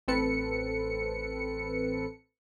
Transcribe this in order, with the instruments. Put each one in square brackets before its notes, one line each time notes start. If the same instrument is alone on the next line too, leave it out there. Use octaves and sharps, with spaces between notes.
[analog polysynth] A1 C4 A4 B4 C#7